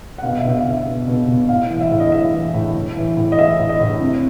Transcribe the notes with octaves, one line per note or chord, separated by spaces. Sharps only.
F#5
B2 F5
E5
B2
F5
B2
E5
B2
B2
B2
A2 F5
E3
E5
A2
D#5
A2 E5
E3
A2
A2
E3
A2
D#5
E3 E5
A2
D#5
A2
C3